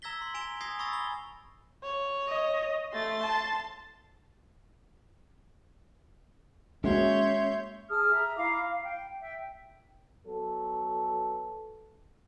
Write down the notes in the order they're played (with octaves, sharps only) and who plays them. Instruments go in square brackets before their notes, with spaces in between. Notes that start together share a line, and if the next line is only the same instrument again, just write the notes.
[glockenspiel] A#5 E6 G#6 A#6 B6 G7
C6
G#5 A#5 D7 F7 G7
G#5 D#6 G#6 A#6 C7
B5 C#6 D#6 E6 A6 A#6
B5 G7
[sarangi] C#5
[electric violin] D#5
[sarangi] A3 [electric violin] C6 A6
[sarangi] A5
[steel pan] G#3 A#3 F#4 [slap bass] C#4 [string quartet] C#5 C6 G6 [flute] E5
[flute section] G#4 A5 D#6 F6
E5 A#5
E4 F5 A#5 D6
F5
G5
E5 G5
[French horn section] F#3 B3 A4